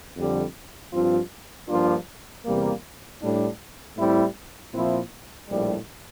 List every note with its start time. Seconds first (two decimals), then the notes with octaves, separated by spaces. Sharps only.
0.17 F2 D3 G3
0.93 G2 F3 C4 F4
1.68 G2 F3 A#3 D4 F4
2.45 E2 C3 G3 A#3
3.21 A2 G3 D4
3.97 A2 G3 C4 E4
4.73 A#2 F3 C4 E4
5.49 A#1 A2 G3